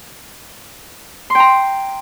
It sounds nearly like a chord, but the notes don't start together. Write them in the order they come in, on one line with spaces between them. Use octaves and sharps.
C6 G5 A#5